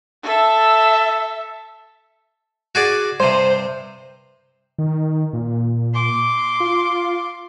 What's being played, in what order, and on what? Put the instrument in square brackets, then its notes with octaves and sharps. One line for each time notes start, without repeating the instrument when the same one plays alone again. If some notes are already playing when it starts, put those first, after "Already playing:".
[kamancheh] A4 E5
[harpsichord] F#4 G#4 D5
[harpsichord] G2 C3 [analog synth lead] C5
[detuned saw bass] D#3
A#2
[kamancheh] C6 D6
[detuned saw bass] F4